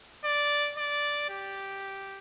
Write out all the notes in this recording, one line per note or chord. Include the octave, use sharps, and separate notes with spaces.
D5
D5
G4